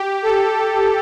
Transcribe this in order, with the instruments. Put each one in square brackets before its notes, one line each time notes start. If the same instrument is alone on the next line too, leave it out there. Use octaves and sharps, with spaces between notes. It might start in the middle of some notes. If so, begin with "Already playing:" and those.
Already playing: [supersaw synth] G4
A4